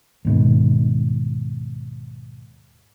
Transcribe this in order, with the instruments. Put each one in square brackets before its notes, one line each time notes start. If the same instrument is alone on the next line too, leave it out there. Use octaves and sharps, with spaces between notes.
[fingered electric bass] D#2 G#2 B2